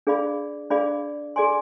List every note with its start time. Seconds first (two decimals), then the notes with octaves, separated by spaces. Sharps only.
0.07 D4 G#4 D5 F5 B5
0.70 D4 G#4 D5 F5 B5
1.36 G#4 D5 G#5 C6